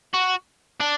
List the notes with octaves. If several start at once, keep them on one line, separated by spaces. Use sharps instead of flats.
F#4
D4